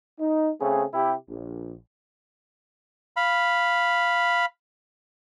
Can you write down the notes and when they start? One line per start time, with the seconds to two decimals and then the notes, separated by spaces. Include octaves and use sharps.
0.20 D#4
0.61 C#3 A3 C4 G#4
0.94 C3 E4 G4
1.29 A#1
3.16 F5 B5